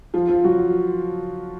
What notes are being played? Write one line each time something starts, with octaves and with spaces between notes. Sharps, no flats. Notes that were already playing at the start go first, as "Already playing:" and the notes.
F3 F4
F3 F4
F#3 F#4